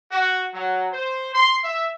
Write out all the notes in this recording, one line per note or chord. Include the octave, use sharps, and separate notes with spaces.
F#4
F#3
C5
C6
E5